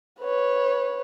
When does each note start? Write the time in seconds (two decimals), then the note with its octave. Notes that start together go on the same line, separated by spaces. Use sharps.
0.21 B4 C#5